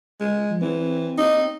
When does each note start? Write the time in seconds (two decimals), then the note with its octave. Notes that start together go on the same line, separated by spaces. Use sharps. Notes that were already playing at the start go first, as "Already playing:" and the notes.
0.20 G#3
0.50 F3
0.62 E3 C4
1.18 D#4